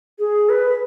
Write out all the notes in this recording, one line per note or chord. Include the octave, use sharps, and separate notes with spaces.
G#4
B4